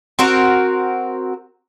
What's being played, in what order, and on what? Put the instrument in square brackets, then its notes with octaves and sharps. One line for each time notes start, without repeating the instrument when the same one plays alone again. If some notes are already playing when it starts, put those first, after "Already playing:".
[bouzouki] C4 F#4 A#4